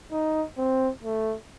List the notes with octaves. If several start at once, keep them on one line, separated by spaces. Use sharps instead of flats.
D#4
C4
A3